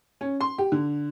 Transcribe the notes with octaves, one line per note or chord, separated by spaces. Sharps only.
C#4
C6
G4
D3